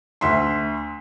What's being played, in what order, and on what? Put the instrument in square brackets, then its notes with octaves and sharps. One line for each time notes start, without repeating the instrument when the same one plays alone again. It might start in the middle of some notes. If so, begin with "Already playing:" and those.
[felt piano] D2 E5 C6